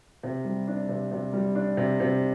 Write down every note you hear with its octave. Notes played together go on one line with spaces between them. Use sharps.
C3
G3
D4
C3
C3
G3
D4
C3
C3